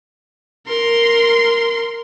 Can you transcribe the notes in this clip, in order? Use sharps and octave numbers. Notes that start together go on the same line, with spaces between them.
A#4 C6